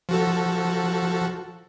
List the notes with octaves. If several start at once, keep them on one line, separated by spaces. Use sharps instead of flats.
F3 F#4 A4